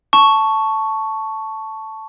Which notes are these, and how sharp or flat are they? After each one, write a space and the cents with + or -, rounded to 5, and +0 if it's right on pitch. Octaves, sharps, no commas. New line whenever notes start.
A5 +0 C#6 +5